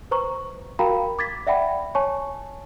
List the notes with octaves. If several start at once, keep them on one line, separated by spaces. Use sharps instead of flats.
B4 C5 A#5 C#6
F#4 A#4 F5 G5 A#5 B5
D6 G#6 A6 B6
D5 E5 F#5 G5 B5
C#5 G#5 A5 C#6